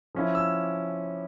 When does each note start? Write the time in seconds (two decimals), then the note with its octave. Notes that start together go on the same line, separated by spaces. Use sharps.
0.15 F3 C#4 E4
0.35 E6